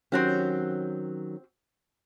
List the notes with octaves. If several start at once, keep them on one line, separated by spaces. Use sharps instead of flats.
D#3 F#3 C4 C#4 F#4 G4